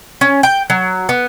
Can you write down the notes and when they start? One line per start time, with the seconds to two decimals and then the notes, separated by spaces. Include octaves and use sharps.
0.21 C#4
0.43 G5
0.70 F#3
1.09 B3